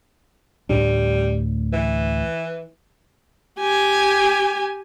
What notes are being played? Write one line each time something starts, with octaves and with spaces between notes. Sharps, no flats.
D2 A2 G3 D4
E3
G4 G#5